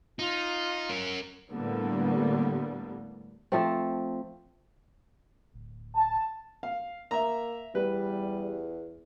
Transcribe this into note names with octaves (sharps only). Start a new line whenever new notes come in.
D#4 F4
C#4 A#4
A2 D3 G3 A#3 B3
F3 A3 C4
D1
A5
F5
A#3 E5 A#5
E2 G3 B4